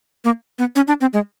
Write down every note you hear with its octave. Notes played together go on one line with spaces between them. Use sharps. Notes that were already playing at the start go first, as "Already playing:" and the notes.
A#3
B3
C#4
D4
C4
G#3